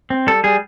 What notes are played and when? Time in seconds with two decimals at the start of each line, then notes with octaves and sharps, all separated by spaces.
0.10 C4
0.27 G3 A4
0.44 G3 G#4